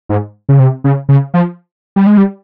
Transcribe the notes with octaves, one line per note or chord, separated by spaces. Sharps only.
G#2
C#3
C3
C#3
C#3
F3
G3
G#3
G3